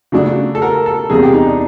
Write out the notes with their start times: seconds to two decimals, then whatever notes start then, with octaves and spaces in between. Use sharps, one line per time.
0.12 C#3 F#3 A3 D4
0.55 A4
0.62 A#4
0.86 A4
1.10 E2 C3 E3 G3 A#3 G#4
1.22 G4
1.34 D#4
1.47 D4